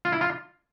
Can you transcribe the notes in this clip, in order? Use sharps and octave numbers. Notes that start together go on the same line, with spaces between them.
F4
E4
F4